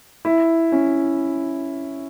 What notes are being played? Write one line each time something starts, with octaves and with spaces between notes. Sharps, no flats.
E4
C#4